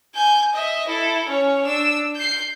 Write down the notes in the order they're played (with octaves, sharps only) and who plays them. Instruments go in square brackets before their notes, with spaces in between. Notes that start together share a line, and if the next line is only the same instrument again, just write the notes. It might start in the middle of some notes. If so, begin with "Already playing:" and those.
[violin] G#5 G6
D#5 E5
E4 A4
C#4 C#5
D4 E6
G6 C7